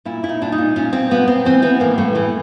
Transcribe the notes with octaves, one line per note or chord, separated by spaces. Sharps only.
A#2 E4
A#2 E4
D#4
A#2 D4
D#4
A#2
A#2 C#4
A#2 C4
A#2 B3
A#2 C4
E3 C4
E3 B3
A2 A#3
A2 A3
E3 A3